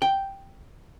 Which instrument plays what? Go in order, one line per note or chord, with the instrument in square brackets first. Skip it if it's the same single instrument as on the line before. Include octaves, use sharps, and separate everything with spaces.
[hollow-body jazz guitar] G5